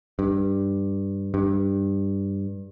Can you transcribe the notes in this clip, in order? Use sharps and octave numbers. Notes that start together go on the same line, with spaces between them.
G2
G2